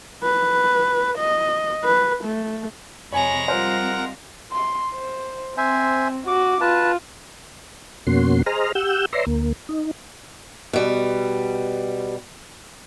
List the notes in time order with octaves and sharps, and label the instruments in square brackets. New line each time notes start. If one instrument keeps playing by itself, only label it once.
[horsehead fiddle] B4
D#5
B4
A3
[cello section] F2 C3 [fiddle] G#3 A#5 [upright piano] C#5 G#5 [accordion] B5 C#6
[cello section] G3 C4 F4 [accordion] A#4 F#5 [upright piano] C5
[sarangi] C6
C5
[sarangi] C4 [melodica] C5 E5 G#5
[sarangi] F#4 [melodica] D6
[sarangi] F4 [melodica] B4 A5
[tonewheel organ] F2 B2 A#3 C#4 F#4 C6
G#4 C5 D#5 A#5 F6
G4 F#5 E6 G6
B4 C#5 D5 E5 A#5 C6
D2 A#3
D#4
[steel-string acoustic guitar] B2 G3